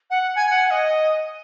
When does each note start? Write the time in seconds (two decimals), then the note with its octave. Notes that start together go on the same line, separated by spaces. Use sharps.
0.10 F#5
0.35 G#5
0.51 F#5
0.67 F#5
0.71 D#5